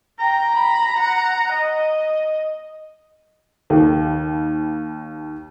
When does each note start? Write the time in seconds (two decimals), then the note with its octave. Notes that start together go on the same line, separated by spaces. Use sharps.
0.20 G5 A#5
0.56 B5
0.98 F#5
1.53 D#5
3.70 D#2 D#3